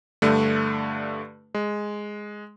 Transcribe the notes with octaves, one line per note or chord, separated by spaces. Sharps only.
G2 D3 A3
G#3